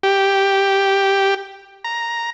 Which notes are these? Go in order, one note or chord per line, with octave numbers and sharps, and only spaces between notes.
G4
A#5